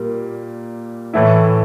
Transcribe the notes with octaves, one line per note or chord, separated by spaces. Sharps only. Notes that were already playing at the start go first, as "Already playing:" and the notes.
Already playing: A#2 G3 A#3
A2 E3 A3 E4